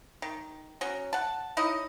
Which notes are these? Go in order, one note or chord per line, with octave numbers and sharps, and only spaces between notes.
D#3
F#3 C#4
F#5 A5
D#4 E4 C#5 D#5